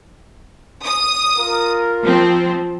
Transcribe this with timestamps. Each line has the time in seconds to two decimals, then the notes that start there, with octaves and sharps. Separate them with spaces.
0.84 D#6
1.37 F4 A#4
2.02 F3 C4